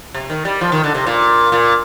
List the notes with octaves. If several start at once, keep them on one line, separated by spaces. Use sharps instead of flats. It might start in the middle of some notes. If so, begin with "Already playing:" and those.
C3
D#3
G3
F3
D#3
D3
C3
A#2
A#2